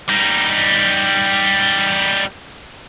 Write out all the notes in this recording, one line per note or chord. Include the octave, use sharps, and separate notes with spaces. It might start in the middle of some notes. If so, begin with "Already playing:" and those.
G3 D#4